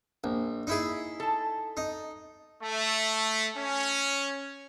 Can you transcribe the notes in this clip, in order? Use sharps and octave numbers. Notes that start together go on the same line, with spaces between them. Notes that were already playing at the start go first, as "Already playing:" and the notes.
A#1
D#4 E4 G#4
A4 A5
D#4
A3
C#4